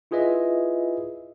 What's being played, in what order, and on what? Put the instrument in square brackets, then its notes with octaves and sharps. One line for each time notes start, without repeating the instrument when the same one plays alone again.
[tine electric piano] E4 F4 G#4 B4 D#5 E5